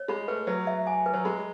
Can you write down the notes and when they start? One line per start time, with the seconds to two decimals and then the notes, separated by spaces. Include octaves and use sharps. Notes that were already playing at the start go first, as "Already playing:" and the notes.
Already playing: C#5
0.08 G#3 B5
0.28 A3 B4
0.47 F#3 B4
0.67 E5
0.87 G#5
1.06 B4
1.14 F#3
1.25 G#3 B5